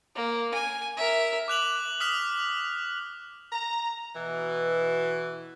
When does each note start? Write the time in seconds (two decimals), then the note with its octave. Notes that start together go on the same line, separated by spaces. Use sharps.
0.15 A#3
0.54 G#5
0.97 A#4 E5
1.48 D6 F#6 F7 F#7
2.00 D#6 F6 B6 F7
3.52 A#5
4.15 B2 E3